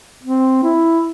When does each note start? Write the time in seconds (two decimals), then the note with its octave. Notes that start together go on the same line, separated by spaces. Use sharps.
0.23 C4
0.63 E4